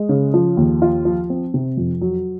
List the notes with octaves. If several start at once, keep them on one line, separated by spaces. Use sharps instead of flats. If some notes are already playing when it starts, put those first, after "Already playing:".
Already playing: G#3
C#3
F3
D#2
F4
F3
C4
C3
F2
F#3